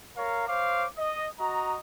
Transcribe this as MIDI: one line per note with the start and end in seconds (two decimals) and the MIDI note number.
0.17 0.45 70
0.17 0.45 73
0.17 0.45 77
0.17 0.45 82
0.48 0.86 72
0.48 0.86 73
0.48 0.86 77
0.48 0.86 86
0.97 1.27 75
1.40 1.76 66
1.40 1.76 75
1.40 1.76 82